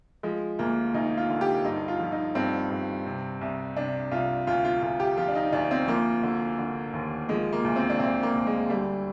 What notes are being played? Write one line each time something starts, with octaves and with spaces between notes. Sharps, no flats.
F3 G#3
D2 A#3
D2 D#4
F4
D3
G4
G2 D#4
F4
F3
D#4
G2 C4
G2
C3
C2
C3 D4
C2 F4
D2 F4
F4
D2 F4
G4
F3 F4
D4
D#4
D2 D4
C4
F3 A#3
D3
D3
D#2
F3 G#3
A#3
D2
C4
D4
D2 C4
A#3
D2
G#3
D3 G3